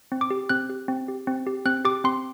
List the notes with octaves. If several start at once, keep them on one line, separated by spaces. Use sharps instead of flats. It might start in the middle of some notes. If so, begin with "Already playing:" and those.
C4
D6
G4
C4 F#6
G4
C4
G4
C4
G4
C4 F#6
G4 D6
C4 C6